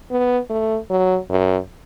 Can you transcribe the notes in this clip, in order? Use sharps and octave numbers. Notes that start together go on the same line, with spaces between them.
B3
A3
F#3
F#2